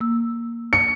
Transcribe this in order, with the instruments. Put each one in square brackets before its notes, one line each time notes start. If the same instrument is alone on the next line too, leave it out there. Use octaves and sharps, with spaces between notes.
[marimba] A#3 E6
[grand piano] C#7